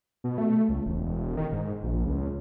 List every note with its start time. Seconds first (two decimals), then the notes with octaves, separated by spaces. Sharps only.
0.24 B2
0.38 A3
0.69 C#2
0.86 E1
1.37 D#3
1.52 G#2
1.83 A#1
2.06 C#2